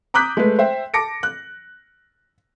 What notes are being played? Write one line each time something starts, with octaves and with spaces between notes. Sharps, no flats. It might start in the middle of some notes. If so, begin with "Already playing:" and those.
A#5 D6 D#6 F#6 G6 B6
G#3 A3 G#4 B4
C5 E5 G5
A5 D6 A#6 C#7 D7
F#6